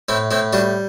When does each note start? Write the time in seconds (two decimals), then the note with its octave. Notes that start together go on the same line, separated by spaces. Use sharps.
0.09 A2 C4 E4
0.31 A2 C4 E4
0.53 G3 D4 F#4